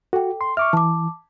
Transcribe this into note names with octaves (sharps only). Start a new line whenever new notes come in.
F#4 A4 G5
C6
E5 C#6 D6 F6
E3 A5 D6